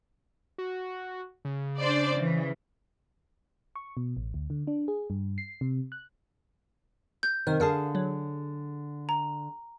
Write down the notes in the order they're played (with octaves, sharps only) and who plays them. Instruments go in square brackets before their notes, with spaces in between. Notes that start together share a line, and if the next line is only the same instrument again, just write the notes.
[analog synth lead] F#4
C#3
[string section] D4 C5 D5
E3
[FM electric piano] C#6
B2
A1
D2
D3
D4
G#4
G2
C7
C3
F#6
[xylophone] G6
[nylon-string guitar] C3 D#3 [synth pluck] A#4
[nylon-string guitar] D3 G#4 A5 [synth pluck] A#4 F5 D#6
[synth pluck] F#3
[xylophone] A#5